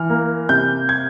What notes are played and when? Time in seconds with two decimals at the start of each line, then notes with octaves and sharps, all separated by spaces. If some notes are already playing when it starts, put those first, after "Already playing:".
Already playing: E3 F6
0.10 A#3
0.49 C3 G6
0.89 G#6